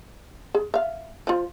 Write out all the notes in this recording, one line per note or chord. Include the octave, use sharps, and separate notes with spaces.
G#4
E5 F5
F3 F4